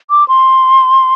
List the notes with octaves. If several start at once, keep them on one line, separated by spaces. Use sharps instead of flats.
D6
C6